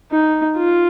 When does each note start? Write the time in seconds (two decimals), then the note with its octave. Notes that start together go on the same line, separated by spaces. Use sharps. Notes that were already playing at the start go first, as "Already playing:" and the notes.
0.12 D#4
0.57 F4